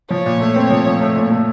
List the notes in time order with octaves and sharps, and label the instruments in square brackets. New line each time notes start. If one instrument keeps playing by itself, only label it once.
[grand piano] F3 [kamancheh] C#5
[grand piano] A#2
A3
C4
F3
F3
A3
A#2
A3